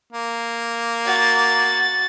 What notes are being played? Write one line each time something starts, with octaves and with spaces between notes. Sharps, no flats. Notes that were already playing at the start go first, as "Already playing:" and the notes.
A#3
F#4 A6